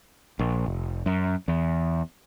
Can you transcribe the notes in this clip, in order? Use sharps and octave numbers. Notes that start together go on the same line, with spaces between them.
A#1
F1
F#2
E2